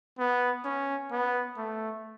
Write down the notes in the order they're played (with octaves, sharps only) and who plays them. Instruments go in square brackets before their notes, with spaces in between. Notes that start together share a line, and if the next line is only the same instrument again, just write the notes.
[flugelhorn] B3
C#4
B3
A3